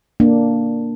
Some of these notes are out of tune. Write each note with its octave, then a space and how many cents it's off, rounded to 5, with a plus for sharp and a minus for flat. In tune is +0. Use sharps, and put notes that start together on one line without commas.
A#3 +0 D4 +0